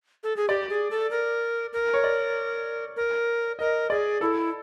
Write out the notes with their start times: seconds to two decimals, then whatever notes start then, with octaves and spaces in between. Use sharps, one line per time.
0.24 A4
0.36 G#4
0.49 G4 D5
0.70 G#4
0.90 A4
1.11 A#4
1.73 A#4
1.94 C#5
2.04 D5
2.96 A#4
3.59 A#4 D#5
3.90 G#4 D5
4.21 E4 A4